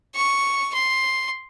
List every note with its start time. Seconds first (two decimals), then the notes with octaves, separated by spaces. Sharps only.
0.15 C#6
0.75 C6